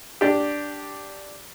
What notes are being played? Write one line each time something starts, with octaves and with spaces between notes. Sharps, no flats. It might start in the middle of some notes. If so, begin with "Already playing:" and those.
D4 G4